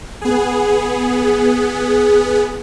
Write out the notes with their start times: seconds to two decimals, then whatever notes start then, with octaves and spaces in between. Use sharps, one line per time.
0.21 B3 G#4